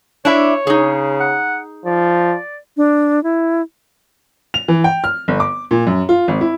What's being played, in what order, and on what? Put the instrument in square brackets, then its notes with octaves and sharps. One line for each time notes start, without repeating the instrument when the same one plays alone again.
[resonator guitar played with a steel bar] D4 E4 E5 [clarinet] C#5
[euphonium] C#3 [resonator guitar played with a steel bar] D#4 G#4
[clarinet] F#5
[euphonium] F3 [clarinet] D5
[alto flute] D4
E4
[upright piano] F7
E3
G5
F6
G1
D6
A#2
F#2
F4
G#1
E4